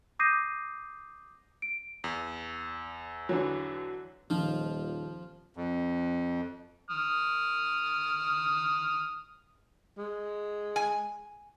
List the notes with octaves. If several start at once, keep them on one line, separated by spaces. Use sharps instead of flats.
D6 D#6 G6 A#6 C7 D#7
D7
E2
D3 E3 F#3
D#1 D#3 F3
F2
D#6 F6
G#3
G#5